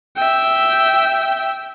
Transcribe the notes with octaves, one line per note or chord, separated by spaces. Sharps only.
E5 G5